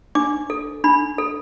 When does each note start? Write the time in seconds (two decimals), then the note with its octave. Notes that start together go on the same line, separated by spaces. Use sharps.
0.15 D4 D6
0.50 A4
0.84 D4 B5
1.18 A4